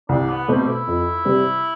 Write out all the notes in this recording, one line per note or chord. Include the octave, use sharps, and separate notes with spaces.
C2 D4
B3
B2 G3 A3 C4
E4
F2
C3 G3 C4